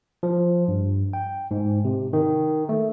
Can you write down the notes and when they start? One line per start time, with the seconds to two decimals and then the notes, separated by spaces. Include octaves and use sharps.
0.23 F3
0.68 G2
1.13 G5
1.51 G#2
1.85 C3
2.13 D#3
2.69 A3